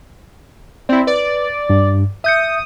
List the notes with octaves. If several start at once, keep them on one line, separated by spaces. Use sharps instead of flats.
C4 E4 D5
B4 D5
G2
E5 D#6 G6 C#7